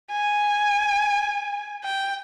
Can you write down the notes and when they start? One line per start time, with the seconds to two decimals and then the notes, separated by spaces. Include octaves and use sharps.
0.11 G#5
1.84 G5